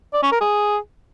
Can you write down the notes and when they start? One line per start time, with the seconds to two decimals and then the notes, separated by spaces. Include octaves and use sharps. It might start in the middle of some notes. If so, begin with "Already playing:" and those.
0.14 D5
0.23 C#4
0.32 A#4
0.41 G#4